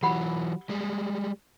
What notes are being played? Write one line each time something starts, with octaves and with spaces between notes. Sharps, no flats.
E3 F#3 G4 F#5 B5
G3 G#3